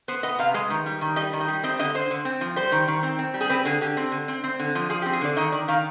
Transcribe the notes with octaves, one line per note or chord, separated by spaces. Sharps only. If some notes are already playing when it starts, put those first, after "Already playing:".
B3 C5
B3 D#5
C3 F5
G#3 D#5
D#3
G3
D#3
G3 D#5
D#3
D#5
G3
C4 D#5
D3 D#5
D3 C5
D3
C4
F3
G3 C5
D#3
D#3
C4
C4
G3
G#4
C4 B4
D3 G#4
D3 G4
C4
D3
C4
C4
D3
F3
F3 G#4
G4
C4
G#4
D3 D5
D#3 D#5
D#3 D5
D#3 F5